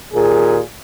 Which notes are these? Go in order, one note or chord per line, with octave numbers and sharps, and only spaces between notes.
D#2 A#2 G#4